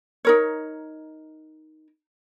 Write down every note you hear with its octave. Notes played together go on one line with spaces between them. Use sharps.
D#4 A#4 C#5